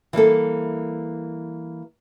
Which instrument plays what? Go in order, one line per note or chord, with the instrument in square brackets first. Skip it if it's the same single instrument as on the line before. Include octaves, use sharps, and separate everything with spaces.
[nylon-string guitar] E3 G3 A#3 A4